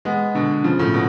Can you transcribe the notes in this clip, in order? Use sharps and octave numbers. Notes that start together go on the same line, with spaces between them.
G#3 B3
B2 D3
C#3 F3
A2 C#3
B2